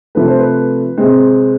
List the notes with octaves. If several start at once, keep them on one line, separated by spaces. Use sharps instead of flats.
C3 F3 A3 B4
C5
B4
C3 G#3 C4